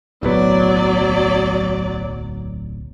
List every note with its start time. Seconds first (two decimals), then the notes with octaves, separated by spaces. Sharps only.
0.23 D1 B1 F#3 B3 D5